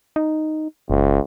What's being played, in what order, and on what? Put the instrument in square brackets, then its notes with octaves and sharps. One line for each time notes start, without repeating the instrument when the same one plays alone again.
[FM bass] D#4
[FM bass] F#1 [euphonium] C#2